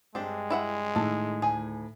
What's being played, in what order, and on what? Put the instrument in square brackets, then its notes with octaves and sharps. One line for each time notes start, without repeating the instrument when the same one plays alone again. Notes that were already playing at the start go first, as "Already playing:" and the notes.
[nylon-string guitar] G2 G4 [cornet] G#3 [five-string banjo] C4 D4
[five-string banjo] E4 E5 F#5
[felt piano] A2 D#3 [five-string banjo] A4
[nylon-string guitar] D2 G#5 [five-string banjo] G#4